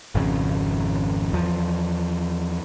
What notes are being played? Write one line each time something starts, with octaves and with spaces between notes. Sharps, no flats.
G#1 F2 C#3
E2 F3